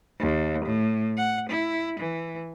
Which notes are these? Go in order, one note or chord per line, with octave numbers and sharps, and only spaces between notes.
D#2
A2
F#5
E4
E3